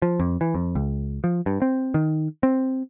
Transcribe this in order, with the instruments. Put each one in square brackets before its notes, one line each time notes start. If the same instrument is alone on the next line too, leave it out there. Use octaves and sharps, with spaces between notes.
[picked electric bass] F3
F2
E3
F2
C#2
F3
G2
C4
D#3
C4